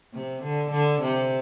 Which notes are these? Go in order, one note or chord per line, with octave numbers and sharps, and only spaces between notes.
C3
D3
D3
C3